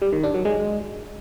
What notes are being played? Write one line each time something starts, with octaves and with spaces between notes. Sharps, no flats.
G3
D#3
D4
F#3
G#3